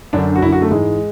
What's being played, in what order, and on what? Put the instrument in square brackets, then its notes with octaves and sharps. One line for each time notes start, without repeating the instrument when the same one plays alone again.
[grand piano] F#2 D3 D4
F#4
F#2 E4
D3
F#4
A3
G#2 E3 G#3